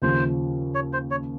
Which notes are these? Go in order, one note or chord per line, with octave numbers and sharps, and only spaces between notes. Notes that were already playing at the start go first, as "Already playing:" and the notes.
D#2 C#3 F3 C5
C#5
C5
C#5